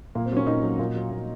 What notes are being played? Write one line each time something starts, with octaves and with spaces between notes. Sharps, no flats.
A#2 A#3
C4
F#3
C#4
A#2 D#4
F#3
A#2
F#3
A#2